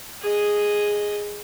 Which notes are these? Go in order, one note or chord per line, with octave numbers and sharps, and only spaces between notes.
G#4 D#5